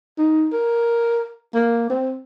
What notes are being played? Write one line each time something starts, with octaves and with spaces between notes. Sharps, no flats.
D#4
A#4
A#3
C4